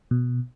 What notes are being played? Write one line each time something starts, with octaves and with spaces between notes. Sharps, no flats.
B2